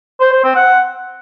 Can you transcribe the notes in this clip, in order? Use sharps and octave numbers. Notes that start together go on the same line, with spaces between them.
C5
C5
C4
F#5